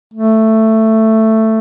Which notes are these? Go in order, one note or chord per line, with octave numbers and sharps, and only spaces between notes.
A3